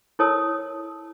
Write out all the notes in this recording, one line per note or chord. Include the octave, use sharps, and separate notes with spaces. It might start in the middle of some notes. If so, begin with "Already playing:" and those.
E4 A4 A#4 C#5 A5 D#6